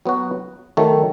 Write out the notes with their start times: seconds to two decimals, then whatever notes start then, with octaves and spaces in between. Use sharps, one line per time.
0.05 F#3 B3 F#4
0.77 D#3 F#3 A3